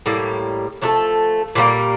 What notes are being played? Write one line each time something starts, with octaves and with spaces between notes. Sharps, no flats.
A2 G3 A#3
F3 A3 D4 A4
A#2 G3 A#3